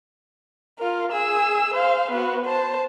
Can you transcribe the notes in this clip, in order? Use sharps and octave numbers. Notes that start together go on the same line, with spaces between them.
F4 A#4
G#4 E6
C5 F5
B3 F#4
C5 A5